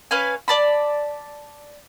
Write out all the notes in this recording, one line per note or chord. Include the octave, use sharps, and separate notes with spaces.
C#4 B4 F5 G#5
D5 A5 B5